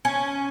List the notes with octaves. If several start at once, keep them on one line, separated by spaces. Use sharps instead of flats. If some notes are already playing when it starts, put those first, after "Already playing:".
C#4